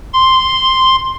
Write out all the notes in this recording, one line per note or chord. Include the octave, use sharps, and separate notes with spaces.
C6